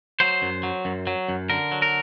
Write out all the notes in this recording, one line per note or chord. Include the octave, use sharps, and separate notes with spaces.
F#3 C5
F#2
F#3
F#2
F#3
F#2
D3 A#4
F#3
A#4